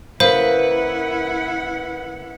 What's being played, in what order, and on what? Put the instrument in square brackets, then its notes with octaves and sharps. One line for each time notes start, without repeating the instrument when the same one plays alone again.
[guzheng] C#3 A#3 [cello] E4 F#5 [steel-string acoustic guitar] B4 [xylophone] C5 F5